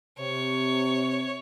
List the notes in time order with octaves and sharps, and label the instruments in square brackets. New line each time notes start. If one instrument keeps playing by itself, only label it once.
[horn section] C3 [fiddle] C#5